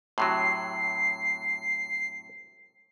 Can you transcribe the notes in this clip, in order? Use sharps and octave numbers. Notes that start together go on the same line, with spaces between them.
A2 C3 F#3 C7